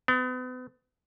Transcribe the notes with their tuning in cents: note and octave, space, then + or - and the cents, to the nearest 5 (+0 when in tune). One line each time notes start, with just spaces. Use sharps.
B3 +40